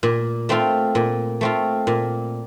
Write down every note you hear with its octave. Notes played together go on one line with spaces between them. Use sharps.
A#2
A3 C4 F4
A#2
A3 C4 F4
A#2